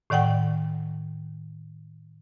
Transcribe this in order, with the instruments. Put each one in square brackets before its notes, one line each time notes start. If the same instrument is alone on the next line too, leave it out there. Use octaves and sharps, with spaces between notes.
[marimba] A2 D#3 D5 F#5 G5